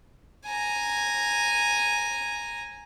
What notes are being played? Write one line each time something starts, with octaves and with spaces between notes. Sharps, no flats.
G#5 A#5